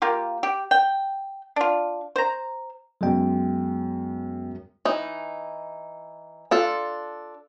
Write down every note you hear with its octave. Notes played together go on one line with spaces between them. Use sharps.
A#3 F4 G4
G4
G5
D4 F4
C5 A#5
F#2 F#3 G#3 B3 G5
E3 D#4
D4 F4 A4